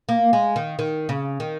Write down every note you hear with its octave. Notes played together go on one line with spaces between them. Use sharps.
A#3
G#3
D#3
D#3
C#3
D#3